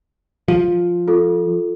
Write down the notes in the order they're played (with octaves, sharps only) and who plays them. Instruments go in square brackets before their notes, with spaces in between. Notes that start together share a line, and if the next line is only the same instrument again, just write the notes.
[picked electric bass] F3
[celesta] F4 A4